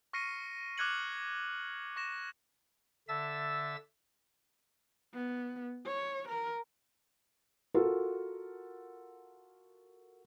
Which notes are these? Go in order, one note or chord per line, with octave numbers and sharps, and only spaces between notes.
C#6 F6 A#6 C7 C#7 D#7
D6 F6 F#6 G#6 C#7 F#7
C#6 A#6 E7
D3 E5 A5 E6 A6
B3
C#5
A#4
F4 F#4 A4 A#4